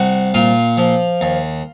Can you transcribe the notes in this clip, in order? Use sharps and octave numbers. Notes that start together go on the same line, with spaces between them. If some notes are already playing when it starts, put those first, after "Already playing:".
Already playing: C2 F#4
A#2 F4
F3
D#2